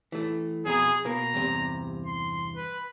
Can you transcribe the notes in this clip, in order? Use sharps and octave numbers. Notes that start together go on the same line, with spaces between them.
E3 A3
F2 B2 G#4 A#5
B2 A#3 A#4 A#5
E2 G2 C3
C6
B4